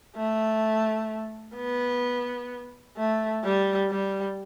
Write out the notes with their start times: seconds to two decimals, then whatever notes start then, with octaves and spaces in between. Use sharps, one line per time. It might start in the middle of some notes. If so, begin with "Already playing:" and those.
0.16 A3
1.56 B3
2.97 A3
3.44 G3
3.89 G3